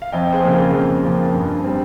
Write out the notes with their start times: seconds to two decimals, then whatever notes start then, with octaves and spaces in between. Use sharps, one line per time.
0.02 F5
0.12 F2 D#5 G5
0.33 G#4 C5
0.43 C#3 F3 A#3
0.54 F4 G#4
0.73 F2
1.03 C#3 F3 A#3
1.34 G2
1.64 G3 C4